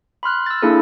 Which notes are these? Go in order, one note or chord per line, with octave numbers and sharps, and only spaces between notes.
B5 C6 F6 F#6
E6 A6
A#3 D4 E4 G#4 A4